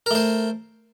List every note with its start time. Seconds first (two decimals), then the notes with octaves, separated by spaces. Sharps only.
0.06 A#4
0.11 A3
0.15 C5